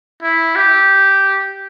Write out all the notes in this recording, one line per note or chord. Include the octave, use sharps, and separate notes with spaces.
E4
G4